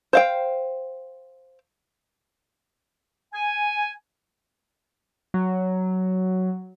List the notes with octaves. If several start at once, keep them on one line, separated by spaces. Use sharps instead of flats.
C5 F5 G5
G#5
F#3